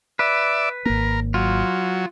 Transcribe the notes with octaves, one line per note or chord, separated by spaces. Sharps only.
B4 D5 E5
G#1 A#3 A#4
F#3 F4